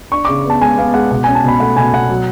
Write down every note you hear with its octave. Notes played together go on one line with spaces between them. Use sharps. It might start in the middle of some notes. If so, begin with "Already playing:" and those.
D4 C#6
C#3 D6
B3 A5
G#3 G#5
B3 F5
G#3 F#5
B2 F#5
C#4 G#5
A5
B2 B5
A3 F#5
B2 G#5
B2 F#5
F#3